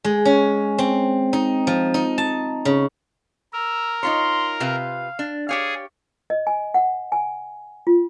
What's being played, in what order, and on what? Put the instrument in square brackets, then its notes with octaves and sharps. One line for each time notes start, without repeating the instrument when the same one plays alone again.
[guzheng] G#3
C#4
C4
D#4
F3
D#4
A5
C#3
[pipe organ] A#4 [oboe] E6
[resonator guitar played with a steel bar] D#4 F4 C#5 [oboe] C6
[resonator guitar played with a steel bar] C3 F4 B4 [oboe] F5
[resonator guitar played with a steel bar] D4
[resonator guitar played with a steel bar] G4 C#5 F5 [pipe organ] G#4 [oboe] D5
[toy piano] D#5
G#5
F#5
G#5
F4